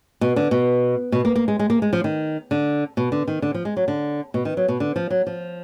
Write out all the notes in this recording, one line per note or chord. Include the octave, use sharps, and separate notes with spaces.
B2
D3
B2
B2
A#3
A#3
G#3
G#3
A#3
G#3
F3
D#3
D3
B2
D3
D#3
D3
F3
G#3
F#3
D3
B2
D#3
F#3
B2
D3
F3
F#3
F3